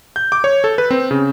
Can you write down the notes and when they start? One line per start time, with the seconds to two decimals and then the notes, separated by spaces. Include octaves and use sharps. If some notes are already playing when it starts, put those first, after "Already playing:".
0.16 G6
0.32 D6
0.44 C#5
0.64 A4
0.78 B4
0.91 C4
1.11 C#3